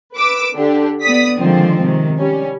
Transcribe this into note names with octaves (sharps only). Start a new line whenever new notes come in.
B4 D6 E6
D3 D4 G4
B3 D5 D#6 B6
D3 D#3 F3 G#3 C4
C3 D#3
G3 C#4